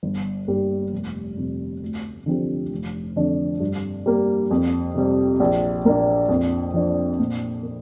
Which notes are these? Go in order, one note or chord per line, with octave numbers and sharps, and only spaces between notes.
G1
G2 G3 A#3 G4
F1
F2 C3
D2
D3 F3 C4 G4
F1
F2 D3 F3 D4
G2
G3 A#3
F2
C3 G3
A#1
A#2 A#3 D4
F2
F3 D4
A#2
A#3